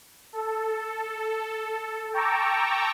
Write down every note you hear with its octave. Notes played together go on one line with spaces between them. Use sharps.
A4
G5 A5 A#5 C#6 D6 E6